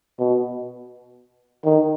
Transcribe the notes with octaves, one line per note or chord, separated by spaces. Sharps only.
B2
D#3